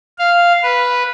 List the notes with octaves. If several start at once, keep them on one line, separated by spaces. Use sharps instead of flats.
F5
B4